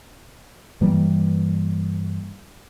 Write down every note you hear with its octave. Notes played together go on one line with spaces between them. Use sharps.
G2 E3 G3 A#3